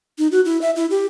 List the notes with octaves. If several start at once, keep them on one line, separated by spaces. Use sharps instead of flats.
D#4
F#4
E4
E5
E4
G4